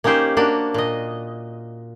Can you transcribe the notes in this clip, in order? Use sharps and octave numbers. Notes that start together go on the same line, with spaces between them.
A#3 C#4 D#4 G4 C5
A#3 D4 F#4
A#2 D#5